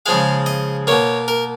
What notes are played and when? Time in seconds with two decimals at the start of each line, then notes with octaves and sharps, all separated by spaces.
0.06 C#3 F3 G#3 F5
0.46 D#5
0.87 B2 A#3 C#5
1.28 A#4